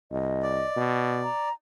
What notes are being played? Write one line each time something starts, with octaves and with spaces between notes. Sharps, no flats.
C2 D#5
D5
B2
A#5